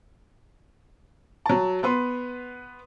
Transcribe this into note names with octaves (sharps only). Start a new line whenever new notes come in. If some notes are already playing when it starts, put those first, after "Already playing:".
F#3 A5
B3 B4 C6